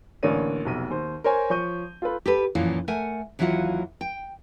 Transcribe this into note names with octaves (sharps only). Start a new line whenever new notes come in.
A1 D3 A#3 C#5 D5 D#7
F1 B1 D#7
D#2 C5
A#4 C5 C#5 G#5
F3 C#5 C#6 G6 D#7
F4 A4 B4
G4 A4 B4
F#2 A#2 E3 F3
A3 A#4 F#5 G#5
D#2 E3 F#3 A#3 F4 F#5
G5